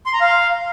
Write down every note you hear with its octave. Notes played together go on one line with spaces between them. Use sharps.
C6
A#5
F5